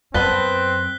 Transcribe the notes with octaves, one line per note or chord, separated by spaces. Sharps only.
F#2 B3 C4 B4 A5 F#6 B6 G7